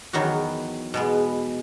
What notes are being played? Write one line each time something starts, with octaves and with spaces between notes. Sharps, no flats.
E2 D#3 F#3 B3 F#4
B2 G#3 B3